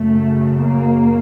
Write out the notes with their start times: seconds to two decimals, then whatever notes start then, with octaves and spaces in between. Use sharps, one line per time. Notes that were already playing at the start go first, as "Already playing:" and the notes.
Already playing: F#2 C#3 A3
0.61 A#3